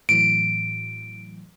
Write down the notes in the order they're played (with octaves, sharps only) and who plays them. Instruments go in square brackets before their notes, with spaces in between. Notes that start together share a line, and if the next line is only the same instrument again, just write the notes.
[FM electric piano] A2 E3 F#3 [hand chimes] D7